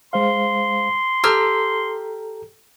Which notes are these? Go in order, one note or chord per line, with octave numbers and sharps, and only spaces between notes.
G#3 C5 F5 C6
G4 A4 A#5 E6 F6